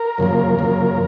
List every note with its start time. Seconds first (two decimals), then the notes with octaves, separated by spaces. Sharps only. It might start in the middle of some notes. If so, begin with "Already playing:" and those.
Already playing: A#4
0.18 F#2 C#3 F3 A#3
0.59 F#2 C#3 F3 A#3